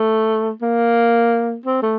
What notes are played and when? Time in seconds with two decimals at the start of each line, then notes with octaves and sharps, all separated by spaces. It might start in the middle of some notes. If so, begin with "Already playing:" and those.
Already playing: A3
0.62 A#3
1.66 C4
1.83 A3